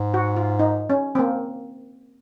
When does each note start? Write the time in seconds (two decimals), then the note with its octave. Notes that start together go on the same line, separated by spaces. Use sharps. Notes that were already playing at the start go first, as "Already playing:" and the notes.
Already playing: G#2
0.14 F#4
0.36 F4
0.59 D#4
0.90 C#4
1.15 C4
1.19 A#3